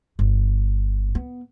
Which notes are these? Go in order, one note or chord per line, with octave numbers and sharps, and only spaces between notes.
G1
B3